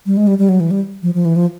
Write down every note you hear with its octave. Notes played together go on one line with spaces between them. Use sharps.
G3
G#3
G3
G3
F#3
E3
G3
F3
F3
E3
F3